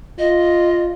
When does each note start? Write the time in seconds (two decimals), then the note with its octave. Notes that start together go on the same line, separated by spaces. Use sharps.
0.19 F4 D#5